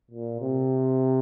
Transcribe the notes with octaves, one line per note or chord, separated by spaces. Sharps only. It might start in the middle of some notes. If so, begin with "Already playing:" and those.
A#2
C3